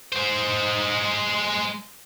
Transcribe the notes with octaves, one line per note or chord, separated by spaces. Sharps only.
G#3 C5